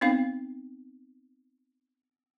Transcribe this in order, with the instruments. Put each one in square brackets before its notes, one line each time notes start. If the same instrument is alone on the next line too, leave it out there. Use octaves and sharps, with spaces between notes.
[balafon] B3 C4 D#4 F5